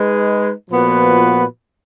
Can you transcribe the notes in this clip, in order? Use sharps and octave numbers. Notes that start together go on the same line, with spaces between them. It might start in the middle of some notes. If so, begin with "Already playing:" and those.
Already playing: G#3 D#4 G#4 B4
A#2 F3 B3 F#4 B4